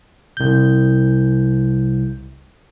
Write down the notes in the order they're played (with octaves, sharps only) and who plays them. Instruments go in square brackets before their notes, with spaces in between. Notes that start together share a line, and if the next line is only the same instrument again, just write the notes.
[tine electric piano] C2 G6